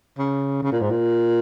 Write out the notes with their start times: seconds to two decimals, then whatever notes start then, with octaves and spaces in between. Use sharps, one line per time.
0.18 C#3
0.63 C#3
0.72 A#2
0.81 G#2
0.90 A#2